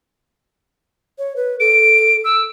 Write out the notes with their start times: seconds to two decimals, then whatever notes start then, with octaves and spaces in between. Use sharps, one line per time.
1.19 C#5
1.36 B4
1.60 A4 D7
2.24 E6